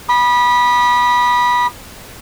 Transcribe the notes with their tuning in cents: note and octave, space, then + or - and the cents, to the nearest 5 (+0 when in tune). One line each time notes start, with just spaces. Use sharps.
B5 -20 D#6 -35